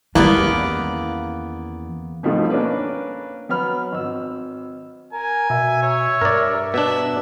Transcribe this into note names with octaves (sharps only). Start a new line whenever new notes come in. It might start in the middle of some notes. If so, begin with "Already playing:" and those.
E2 D#3 E3 G3 A#3 B3 C#4 D5
G2 B2 D#3 F3 A3
A#3 C#4 D4 B4
F#3 B3 B5 F6
G#1 E6
A#4 G#5
B2 E5
C#5 E5
G2 A#4 D5
B2 D4 E5